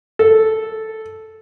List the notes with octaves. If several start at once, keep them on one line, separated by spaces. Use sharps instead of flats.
A4